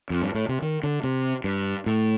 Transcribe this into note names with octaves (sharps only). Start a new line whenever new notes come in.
F2
G2
A2
C3
D#3
D3
C3
G2
A2